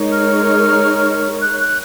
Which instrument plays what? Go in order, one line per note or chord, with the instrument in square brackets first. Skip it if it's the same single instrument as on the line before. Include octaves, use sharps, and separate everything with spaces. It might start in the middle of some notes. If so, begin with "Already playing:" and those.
Already playing: [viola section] G#3 D#4 A#4 C#5
[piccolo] F6
F#6
F#6